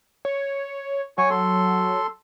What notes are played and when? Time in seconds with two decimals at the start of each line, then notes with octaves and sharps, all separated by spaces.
0.25 C#5
1.18 F#3 C#5 G#5 C#6
1.30 A4 C6